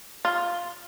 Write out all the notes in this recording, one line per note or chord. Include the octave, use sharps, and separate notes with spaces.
F4